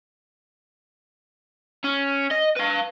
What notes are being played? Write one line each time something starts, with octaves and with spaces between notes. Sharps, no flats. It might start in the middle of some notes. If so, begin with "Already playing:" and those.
C#4
D#5
B4 F5